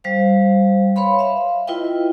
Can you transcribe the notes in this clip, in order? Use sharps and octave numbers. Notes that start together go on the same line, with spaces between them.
G3 C5 F5
B4 C#5 F5 B5 C6
E5 F5
E4 F4 B4 D#5 G5